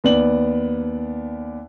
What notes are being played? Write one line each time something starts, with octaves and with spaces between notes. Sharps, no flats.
D#2 B3 D5 F#7